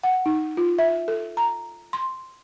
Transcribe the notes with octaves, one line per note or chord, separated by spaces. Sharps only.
F#5
D#4
F4
E5
A4
A#5
C6